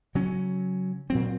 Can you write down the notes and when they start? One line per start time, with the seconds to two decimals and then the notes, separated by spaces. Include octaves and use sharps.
0.15 C#3 F#3 C#4
1.10 A#2 F#3 C4